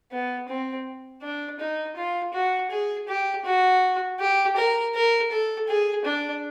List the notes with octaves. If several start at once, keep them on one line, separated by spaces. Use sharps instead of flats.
B3
C4
D4
D#4
F4
F#4
G#4
G4
F#4
G4
A#4
A#4
A4
G#4
D4